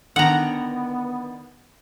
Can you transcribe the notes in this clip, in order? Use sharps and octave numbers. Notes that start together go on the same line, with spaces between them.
D3 D#3 B3 F#5 A#5